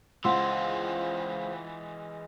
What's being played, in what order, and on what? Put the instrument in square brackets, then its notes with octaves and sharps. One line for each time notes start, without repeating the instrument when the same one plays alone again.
[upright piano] C#2 [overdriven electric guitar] E3 G#3 [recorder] C5 [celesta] F#5 C6 E6